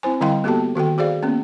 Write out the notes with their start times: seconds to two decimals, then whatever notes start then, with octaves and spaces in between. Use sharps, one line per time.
0.03 C4 E4 C5 G#5
0.21 D3 G3 E4 F5 G5 C6
0.44 A#3 B3 F#4 G4 A4 A5
0.75 D#3 F#4 A4 G5
0.98 F#4 G#4 C5 D5 F5
1.23 A#3 B3 C#4